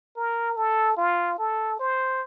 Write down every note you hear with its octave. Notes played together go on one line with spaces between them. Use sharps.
A#4
A4
F4
A4
C5